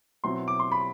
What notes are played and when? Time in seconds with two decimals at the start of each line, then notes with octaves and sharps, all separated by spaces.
0.24 B2 F#3 C4 E4 C6
0.48 D6
0.60 C6
0.72 B5